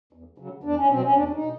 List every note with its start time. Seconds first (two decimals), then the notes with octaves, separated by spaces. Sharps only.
0.13 E2
0.38 C#3 F#3
0.63 E2 D4
0.76 C#4
0.90 B2 F#3 C4
1.02 C#4
1.15 E2 D4
1.27 D4
1.33 D#4
1.42 B2